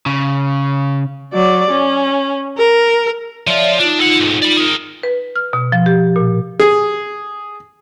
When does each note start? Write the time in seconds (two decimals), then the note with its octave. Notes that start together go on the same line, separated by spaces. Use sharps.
0.06 C#3
1.34 F#3 D5
1.71 C#4
2.58 A#4
3.47 F3 F4 C#5 D5 E5
3.80 D4 D#4 F4
4.00 A4 F#5
4.20 B1 G#2
4.42 D5 B5
4.57 G#4 A#4
5.03 B4
5.36 F6
5.53 B2
5.72 F3
5.86 G4
6.16 A#2
6.60 G#4